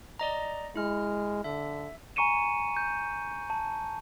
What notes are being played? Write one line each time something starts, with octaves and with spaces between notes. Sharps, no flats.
D5 D#5 A#5
G#3 E4 F6
D3 E5
G#5 A#5 C#6 C#7 D#7 E7
G6
A5